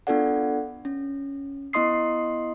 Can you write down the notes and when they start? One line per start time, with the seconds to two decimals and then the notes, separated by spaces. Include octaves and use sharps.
0.07 B3 D4 F4 A4 D5 F#5
0.85 C#4
1.73 B3 E4 D#5 C6 D#6 C7